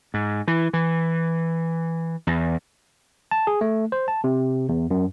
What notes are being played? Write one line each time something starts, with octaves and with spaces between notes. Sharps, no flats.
G#2
E3
E3
E2
A5
G#4
A3
C5
A5
C3
E2
F#2